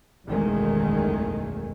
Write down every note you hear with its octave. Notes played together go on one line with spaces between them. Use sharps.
F#1 B1 E2 D#3 G#3 A3